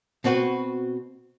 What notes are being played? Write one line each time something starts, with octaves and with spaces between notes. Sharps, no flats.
B2 C4 F#4 B4